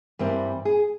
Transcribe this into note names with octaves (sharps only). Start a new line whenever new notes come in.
G2 E3 G3 C4 A#4
G#4